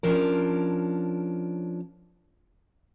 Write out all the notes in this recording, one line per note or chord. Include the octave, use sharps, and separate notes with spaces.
F3 C#4 D4 A#4